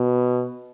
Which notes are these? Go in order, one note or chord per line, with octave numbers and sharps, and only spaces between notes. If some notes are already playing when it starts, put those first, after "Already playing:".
Already playing: B2